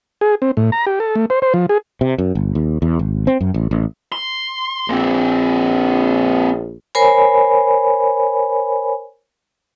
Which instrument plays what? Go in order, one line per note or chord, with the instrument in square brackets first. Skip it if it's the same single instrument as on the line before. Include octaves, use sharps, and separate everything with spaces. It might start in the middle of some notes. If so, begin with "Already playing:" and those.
[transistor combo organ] G#4
C4
A2
A#5
G4
A4
A3
C5
C5
F3
G#4
[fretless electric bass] C3
F#2
G1
D#2
E2
G#1
C4
F#2
A1
A1
[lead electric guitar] C6
[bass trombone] A#1 [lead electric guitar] A#3 C4
[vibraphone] A#4 C5 C#5 G#5 B5